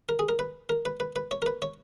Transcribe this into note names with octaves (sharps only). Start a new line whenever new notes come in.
A#4
G#4
A#4
B4
A#4
B4
B4
B4
C#5
A#4
B4
C#5